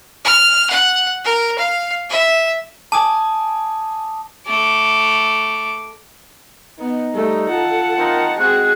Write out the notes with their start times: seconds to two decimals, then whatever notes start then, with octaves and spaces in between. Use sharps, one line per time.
0.24 F6
0.70 F#5
1.25 A#4
1.58 F5
2.10 E5
2.92 G#5 A5 D6 D#6
4.46 A3 D6
6.79 B3 D#4
7.15 G3 A3 A4
7.49 F4 F#5 A5
7.97 A#3 C4 D#4 A#4
8.38 G#3 C4 F#4 G#4 F#6